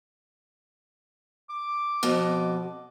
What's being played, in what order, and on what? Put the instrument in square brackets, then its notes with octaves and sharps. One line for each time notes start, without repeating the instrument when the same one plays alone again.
[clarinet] D6
[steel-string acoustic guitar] F2 B2